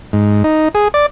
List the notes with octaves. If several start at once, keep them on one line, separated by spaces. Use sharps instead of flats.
G#2
D#4
G#4
D5